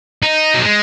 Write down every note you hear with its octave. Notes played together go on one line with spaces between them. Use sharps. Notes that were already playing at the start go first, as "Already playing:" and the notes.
D#4
F#3
G#3